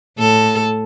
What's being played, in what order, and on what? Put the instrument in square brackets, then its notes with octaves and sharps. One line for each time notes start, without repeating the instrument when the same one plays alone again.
[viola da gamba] A2 A4